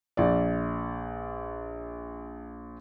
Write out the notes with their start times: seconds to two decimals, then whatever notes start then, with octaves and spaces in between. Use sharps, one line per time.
0.17 A#1 D5